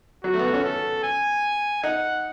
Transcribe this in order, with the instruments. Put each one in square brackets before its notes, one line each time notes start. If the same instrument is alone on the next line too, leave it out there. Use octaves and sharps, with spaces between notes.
[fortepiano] F#3 [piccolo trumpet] F#4
[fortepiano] A3
B3
A3
C#4
[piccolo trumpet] A4
G#5
[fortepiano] D#4 [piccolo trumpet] F#5